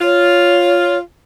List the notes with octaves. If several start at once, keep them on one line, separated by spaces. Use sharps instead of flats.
F4 C#5